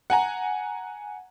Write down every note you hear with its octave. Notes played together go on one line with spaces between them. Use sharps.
F#5 G#5 A#5